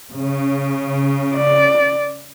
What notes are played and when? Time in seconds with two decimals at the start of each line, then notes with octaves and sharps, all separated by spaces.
0.13 C#3
1.35 D5